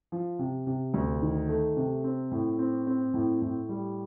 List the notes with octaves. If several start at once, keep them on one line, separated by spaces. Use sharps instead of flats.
F3
C3
C3
D2
D#3
A3
C3
C4
A2
C4
C4
A2
A2
G3